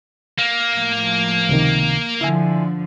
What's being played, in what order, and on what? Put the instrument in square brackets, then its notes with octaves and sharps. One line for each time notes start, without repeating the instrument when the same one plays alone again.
[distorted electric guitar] A#3
[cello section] A2 F3
[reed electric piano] C#2 C3 D#3
[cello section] D3 F3 [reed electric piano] E4 E5 G#5